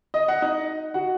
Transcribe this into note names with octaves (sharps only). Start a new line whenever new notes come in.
D#5
F#5
D#4 D#5
F#4 F#5